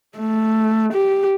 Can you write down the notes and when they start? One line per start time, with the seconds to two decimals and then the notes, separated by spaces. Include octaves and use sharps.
0.18 A3
0.93 G4